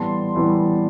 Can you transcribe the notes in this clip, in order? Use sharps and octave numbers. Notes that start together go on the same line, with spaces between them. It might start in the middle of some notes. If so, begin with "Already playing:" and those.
Already playing: A2 E3 G3 B3 A5 C6
A2 E3 G3 B3